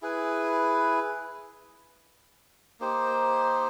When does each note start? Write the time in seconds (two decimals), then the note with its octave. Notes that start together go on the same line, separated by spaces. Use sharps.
0.02 E4 G#4 B4
2.80 A#3 D#4 G4 C5